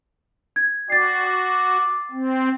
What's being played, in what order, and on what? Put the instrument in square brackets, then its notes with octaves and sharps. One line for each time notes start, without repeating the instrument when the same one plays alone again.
[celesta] G#6
[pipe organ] F#4 [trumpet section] D5 G5 D6 [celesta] A6 C7
[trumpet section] D6
[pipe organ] C4